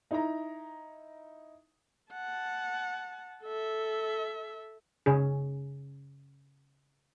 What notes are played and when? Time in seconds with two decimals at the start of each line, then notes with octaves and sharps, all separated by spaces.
0.11 D#4 E4 A#5
2.13 F#5 A5
3.44 A4 E5
5.06 C#3 C#4 G#4